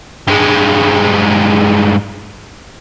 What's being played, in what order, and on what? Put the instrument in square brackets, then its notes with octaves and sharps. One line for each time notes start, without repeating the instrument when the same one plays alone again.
[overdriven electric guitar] G2 G#3